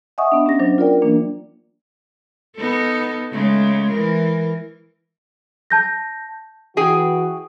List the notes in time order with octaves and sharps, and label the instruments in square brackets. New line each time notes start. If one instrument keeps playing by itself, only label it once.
[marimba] D#5 E5 F#5 G#5 C#6 D#6
B3 D4
C#4 G4 D#5 A#6
F#3 D4 C5
F4 A#4 D5 G5
E3 A#3 D4
[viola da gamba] B3 D#4 A4
C#3 G#3 A3
E3 A#4
[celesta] A5 G6 A#6
[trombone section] E3 F#4 [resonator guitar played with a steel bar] G#4 G5